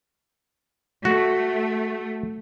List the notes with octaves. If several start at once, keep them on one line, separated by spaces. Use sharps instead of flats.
A3 F#4